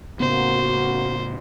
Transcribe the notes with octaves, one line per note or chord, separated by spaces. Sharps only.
A2 C#3 A#3 B3 F#4 C5